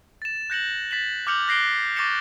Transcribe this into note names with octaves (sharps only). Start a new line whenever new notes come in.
A6 E7
F#6 G6 A#6 C#7 E7 F#7
A6 B6 E7 F#7
D6 F6 G6 C#7 F7 F#7
F#6 A#6 C7 D7 G7
C#6 D6 A6 A#6 C#7 E7